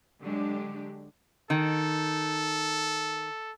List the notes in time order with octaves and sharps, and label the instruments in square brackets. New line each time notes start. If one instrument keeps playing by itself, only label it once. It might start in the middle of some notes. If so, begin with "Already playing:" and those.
[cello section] D3 F#3 G#3 D4 G4
[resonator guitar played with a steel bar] D#3 [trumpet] A4